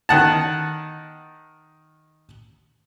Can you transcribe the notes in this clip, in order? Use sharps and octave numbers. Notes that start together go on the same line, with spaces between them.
D#3 F#5 A5